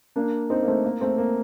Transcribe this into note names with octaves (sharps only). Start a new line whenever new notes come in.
A#3 D4
C4 D#4
A#3
A3 C4
A#3
A3 C4
A#3